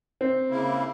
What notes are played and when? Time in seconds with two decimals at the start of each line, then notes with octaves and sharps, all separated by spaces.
0.21 C4
0.50 C#3 A#3 E4